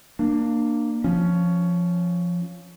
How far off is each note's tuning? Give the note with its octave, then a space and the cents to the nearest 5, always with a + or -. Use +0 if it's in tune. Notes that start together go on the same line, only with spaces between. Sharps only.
A#3 +0 D4 +25
F3 +0 C#4 +10